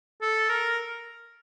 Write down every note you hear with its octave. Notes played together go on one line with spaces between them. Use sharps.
A4
A#4